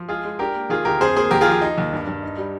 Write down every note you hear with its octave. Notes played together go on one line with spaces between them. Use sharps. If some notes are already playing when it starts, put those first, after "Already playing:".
Already playing: F3
G#3 F4 G#4
G#3
D4 G4 A#4
A#3
D#3 F4 G#4
D2 G4 A#4
F2 G#4 C5
A#3 G#4 C5
D#2 G4 A#4
F4 G#4
F3
F4
D#4
D#2
G2
G2
D#4
G3